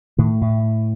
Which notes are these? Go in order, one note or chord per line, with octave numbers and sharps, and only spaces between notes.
A2 D#3
A2